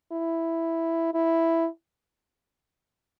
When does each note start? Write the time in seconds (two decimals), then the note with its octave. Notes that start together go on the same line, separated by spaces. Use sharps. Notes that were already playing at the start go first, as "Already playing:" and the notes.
0.12 E4
1.14 E4